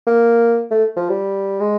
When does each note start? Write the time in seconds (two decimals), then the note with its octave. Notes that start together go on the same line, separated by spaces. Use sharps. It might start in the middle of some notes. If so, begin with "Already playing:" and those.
0.07 A#3
0.71 A3
0.96 F3
1.10 G3
1.60 G#3